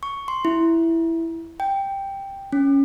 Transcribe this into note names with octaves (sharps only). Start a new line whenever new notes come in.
C#6
C6
E4
G5
C#4